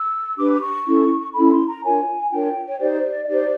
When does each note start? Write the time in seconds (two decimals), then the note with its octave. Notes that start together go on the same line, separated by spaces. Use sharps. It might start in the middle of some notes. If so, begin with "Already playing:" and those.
Already playing: E6
0.38 D4 G4 B4 D6
0.53 D6
0.62 C#6
0.87 C#4 E4 A4
1.34 C#4 E4 A4 B5
1.50 C6
1.68 A#5
1.83 D4 F4 A#4 C#5 G#5
2.31 D4 F4 A#4 C#5 G5
2.67 C#5
2.80 D#4 G4 C5 D5
3.23 D#5
3.27 D#4 G4 C5 D5